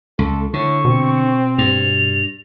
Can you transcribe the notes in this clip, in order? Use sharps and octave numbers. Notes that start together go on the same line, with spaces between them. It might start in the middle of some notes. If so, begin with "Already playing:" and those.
C#2 A4
A2 D3 C#6
B2 C4
G2 F7